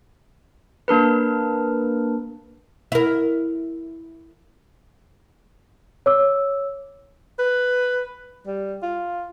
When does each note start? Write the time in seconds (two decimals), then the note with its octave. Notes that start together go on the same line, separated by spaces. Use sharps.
0.88 A#3 D4 A#4 B4
2.92 E4 A#4
6.06 C#5 D6 E6
7.39 B4
8.47 G3
8.83 F4